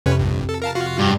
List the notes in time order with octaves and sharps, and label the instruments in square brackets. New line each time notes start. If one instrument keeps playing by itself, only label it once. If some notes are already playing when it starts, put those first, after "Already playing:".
[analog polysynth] F2 C3 [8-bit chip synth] C#4 B4 C#5
[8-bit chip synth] A#1 G2
A4
A#4 F5 A5
F4 F#4 F5
[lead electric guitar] G2